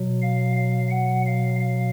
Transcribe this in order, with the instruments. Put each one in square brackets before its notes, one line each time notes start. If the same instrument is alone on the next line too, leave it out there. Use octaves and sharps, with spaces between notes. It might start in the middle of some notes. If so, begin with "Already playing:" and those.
Already playing: [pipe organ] B2 F#3
F5
F5
F#5
F5
F5